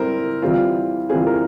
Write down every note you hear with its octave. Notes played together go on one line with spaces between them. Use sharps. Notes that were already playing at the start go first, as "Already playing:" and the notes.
Already playing: G3 C4 E4 A#4 C5
E3 G3 C4 F4
E3 G3 C4 F4 G#4
A#4